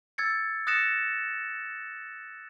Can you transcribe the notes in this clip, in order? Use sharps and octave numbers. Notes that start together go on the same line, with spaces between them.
E6 G#6 A6 C#7
D#6 F#6 A6 A#6 C#7 E7